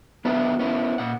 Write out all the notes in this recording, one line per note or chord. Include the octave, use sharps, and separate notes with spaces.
B3 D4 F4 B4 E5
B3 C#4 E4
A#2 F#5